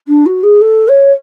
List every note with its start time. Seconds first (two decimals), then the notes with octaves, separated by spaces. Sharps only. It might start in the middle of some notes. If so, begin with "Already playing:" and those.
0.07 D4
0.26 F#4
0.43 G#4
0.61 A4
0.88 C#5